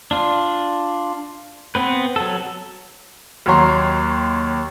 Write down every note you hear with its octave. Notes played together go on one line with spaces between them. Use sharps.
D4 F4
B3 C4 B4
F#3 A4
D#2 F#3 C#5 A#5 C6 C7